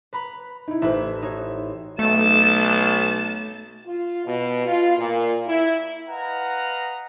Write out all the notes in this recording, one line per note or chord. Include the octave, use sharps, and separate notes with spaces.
B4 A#5 B5
D#4 E4
A1 B4 C5 E5
D#4 F#4 C#5
B1 A3 A5
F4
B2
F4
A#2
E4
B4 D#5 F5 F#5 A#5